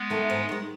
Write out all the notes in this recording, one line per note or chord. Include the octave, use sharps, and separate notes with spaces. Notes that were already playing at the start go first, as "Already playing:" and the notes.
Already playing: G#3 B3
D#3 A3
G#2
D#3 G#3